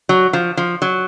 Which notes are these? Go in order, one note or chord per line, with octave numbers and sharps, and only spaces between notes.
F#3
F3
F3
F#3